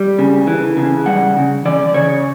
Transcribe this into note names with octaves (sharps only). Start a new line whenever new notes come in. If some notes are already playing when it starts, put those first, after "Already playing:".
Already playing: G3
C#3
E3
C#3
G3 F#5
C#3
E3 D5
C#3 C#5